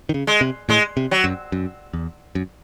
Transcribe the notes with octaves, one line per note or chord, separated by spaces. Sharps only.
D#3
C#3
G#3
C3
A2 G#3
C3
F#3
F#2
F#2
E2
F#2